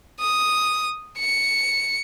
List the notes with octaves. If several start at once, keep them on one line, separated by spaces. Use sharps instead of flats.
D#6
C#7